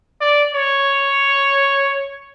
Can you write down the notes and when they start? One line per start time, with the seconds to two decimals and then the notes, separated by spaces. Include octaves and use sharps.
0.21 D5
0.54 C#5